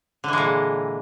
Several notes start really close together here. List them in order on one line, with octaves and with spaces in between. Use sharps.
D3 E3 G#3 A#2